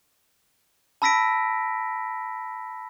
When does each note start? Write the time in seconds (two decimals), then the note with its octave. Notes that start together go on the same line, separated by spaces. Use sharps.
1.02 A5 B5 E6 A#6 B6 D7